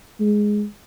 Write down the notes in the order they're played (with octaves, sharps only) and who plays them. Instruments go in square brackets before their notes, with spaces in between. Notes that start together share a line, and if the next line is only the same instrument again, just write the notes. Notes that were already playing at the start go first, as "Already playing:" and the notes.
[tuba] G#3